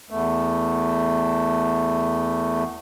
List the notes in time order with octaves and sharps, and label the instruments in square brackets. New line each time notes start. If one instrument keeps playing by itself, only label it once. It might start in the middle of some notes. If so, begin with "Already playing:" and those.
[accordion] E2 A3